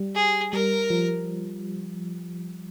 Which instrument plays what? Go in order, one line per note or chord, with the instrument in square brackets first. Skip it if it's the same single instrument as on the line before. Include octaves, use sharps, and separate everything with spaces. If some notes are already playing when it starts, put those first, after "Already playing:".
Already playing: [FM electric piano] G3
[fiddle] G#4
[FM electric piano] G3 [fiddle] A#4
[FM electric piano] F3